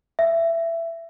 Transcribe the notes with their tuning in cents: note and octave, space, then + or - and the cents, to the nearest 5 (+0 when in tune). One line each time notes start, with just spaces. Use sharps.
E5 +15